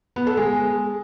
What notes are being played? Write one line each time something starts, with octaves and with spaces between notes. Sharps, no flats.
B3
A4
G#3